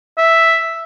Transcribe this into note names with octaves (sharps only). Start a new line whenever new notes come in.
E5